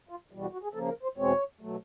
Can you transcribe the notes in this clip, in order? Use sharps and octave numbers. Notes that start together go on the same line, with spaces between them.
F4
E2 B2 G3
F#4
F#4
G#4
C#3 F3 A#3 A4
A#4
C5
E2 B2 G#3 C4 C#5
B2 F#3 A3